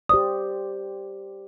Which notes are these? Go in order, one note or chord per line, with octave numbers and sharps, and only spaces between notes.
G4 C5 D5 D#6